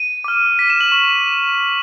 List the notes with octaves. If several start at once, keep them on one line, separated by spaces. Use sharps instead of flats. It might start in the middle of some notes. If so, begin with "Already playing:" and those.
Already playing: D#7
D6 F6
B6
E7
F#7
C#6 F#7